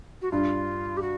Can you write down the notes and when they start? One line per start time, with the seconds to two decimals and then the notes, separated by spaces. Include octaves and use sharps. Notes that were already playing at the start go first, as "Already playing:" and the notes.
0.22 F#4
0.31 G2 F4
0.97 G4
1.01 F#4